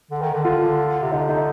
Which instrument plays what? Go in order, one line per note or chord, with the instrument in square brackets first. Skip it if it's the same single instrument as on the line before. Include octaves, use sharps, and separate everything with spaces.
[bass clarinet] D3
D#3
D3
[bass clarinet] D3 [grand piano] F4
[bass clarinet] C3
[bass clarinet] D3 [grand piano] D#4
[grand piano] D#4